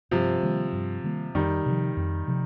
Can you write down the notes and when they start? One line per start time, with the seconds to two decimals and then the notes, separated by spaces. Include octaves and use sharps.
0.11 G2 C3 F3
0.43 D#3 G3 A#3
0.73 G2
1.04 D#3 G3 A#3
1.35 F2 D#3 G3
1.66 C3 F3
1.97 F2
2.28 C3 F3